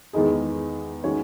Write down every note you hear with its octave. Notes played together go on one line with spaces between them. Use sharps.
E2 D#3 G#3 D#4 G#4
D#3 G#3 C#4 F#4 C#5